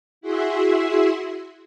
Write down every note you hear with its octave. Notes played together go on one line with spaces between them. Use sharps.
E4 F#4 G#4 E5 C6